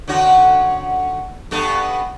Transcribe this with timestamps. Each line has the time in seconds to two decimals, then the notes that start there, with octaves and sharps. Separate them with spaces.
0.08 D3 C#4 F#4
1.51 G2 B3 A4